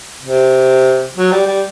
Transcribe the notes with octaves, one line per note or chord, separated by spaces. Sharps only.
C3
F#3
G3
G3